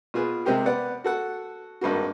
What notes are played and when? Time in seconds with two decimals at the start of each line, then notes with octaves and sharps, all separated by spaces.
0.14 B2 F4 G#4 B4
0.45 C3 G#3 C4 G4 A#4
0.66 B3 D5 F#5
1.04 F#4 A4 F#5
1.81 G#1 G2 A#3 F#4